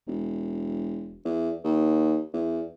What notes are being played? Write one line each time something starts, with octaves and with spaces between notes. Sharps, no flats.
E1
E2
D#2
E2